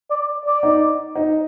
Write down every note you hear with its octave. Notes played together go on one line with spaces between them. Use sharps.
D5
D5
D#4
D#4